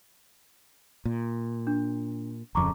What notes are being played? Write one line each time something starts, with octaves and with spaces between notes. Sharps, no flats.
A#2
D4
D1 F2 C#3 A#5 C#6 D6